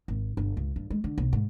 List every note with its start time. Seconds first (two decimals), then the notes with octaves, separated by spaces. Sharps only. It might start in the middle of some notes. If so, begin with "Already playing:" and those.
0.08 G#1
0.37 G1
0.57 C#2
0.76 G2
0.90 G#3
1.04 D3
1.18 B1
1.33 G#2